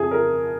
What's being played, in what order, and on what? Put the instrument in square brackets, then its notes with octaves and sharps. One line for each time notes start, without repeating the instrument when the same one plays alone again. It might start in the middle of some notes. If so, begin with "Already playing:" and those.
Already playing: [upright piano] F2 F3 G#4
A#4